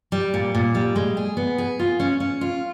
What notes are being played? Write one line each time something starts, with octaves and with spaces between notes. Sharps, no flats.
G3
A#2
A#2
G3
G#3
G#4
B3
G#4
F4
C#4
C#4
F4